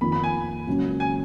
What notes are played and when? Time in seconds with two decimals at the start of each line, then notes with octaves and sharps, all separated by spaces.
0.01 F2 D#3 A#3 F4 B5
0.12 B5
0.24 G#5
0.67 C#2 C#3 F#3 A#3 C#4
1.00 G#5